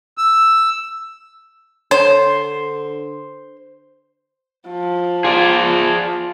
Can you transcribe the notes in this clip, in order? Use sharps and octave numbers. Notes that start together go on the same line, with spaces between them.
E6
D3 C5 C#5
F3
F4 G#4 D5